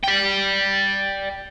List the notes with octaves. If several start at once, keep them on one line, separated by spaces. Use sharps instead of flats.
D5 G5